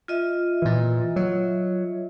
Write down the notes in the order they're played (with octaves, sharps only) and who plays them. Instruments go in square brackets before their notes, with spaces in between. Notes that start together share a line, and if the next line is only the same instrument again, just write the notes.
[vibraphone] F4 D#5 E5
[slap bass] A#2 E3
F#3